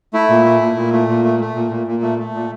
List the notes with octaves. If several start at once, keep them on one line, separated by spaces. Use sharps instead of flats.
A3 E4
A#2
A3
A#2
A#2
A3
A#2
A3
A3
A#2
A#2
A#2
A3
A3
A#2